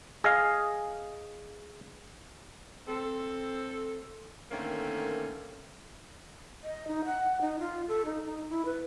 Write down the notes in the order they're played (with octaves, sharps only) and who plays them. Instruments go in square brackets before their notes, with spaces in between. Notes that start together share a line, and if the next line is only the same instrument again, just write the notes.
[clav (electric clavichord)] G#4 D#5 F5
[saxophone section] C4 A4
D3 D#3 A3 A#3 C4 C#4
[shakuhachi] D#5
D#4
F#5
D#4
F4
A4
D#4
D#4
E4
B4